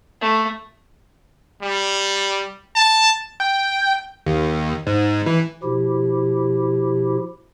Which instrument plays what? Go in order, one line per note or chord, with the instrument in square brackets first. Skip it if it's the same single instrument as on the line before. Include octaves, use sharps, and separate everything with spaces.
[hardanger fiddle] A3
[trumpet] G3
A5
[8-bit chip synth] G5
D#2
G#2
E3
[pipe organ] B2 F3 E4 G4